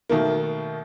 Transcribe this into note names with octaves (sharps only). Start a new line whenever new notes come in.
B2 D#3 A3 A#3